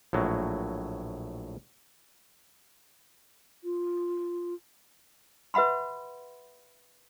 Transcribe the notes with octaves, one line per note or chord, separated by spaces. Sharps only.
A#1 A2 F#3
F4
B4 E5 F#5 B5 C6